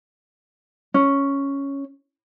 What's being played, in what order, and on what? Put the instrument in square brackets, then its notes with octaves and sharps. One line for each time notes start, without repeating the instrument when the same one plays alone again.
[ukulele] C#4